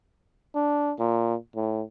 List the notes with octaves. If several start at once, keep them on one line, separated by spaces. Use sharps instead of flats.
D4
A#2
A2